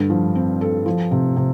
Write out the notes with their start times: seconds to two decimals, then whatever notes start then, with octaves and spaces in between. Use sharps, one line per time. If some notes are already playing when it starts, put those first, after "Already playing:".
Already playing: G2 D3
0.10 F3
0.35 C4
0.61 A4
0.86 F3
1.11 C3
1.37 C3